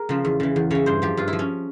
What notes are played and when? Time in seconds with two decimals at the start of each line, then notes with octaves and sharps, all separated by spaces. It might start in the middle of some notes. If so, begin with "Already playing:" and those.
Already playing: G#4 A#4
0.09 C#3 F3
0.25 E2
0.40 C#3 E3
0.56 E2
0.71 C#3 E3 C#5
0.86 G2 C5
1.02 F3 G4
1.17 G2 F4
1.28 E4
1.33 F3
1.39 C#4